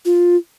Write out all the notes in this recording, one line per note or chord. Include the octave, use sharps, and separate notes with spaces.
F4